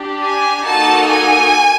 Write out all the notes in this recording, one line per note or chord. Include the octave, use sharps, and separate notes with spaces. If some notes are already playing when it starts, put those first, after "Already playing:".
Already playing: D4 G4
G#5
A#3 D#4 F#4 A4 A5
G#5